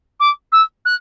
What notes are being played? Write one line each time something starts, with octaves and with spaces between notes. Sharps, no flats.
D6
E6
F#6